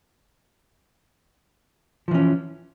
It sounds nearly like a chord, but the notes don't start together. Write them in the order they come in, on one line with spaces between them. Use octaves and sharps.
F3 E3 C#4